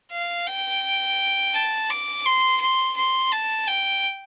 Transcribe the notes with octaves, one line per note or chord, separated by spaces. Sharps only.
F5
G5
A5
D6
C6
C6
C6
A5
G5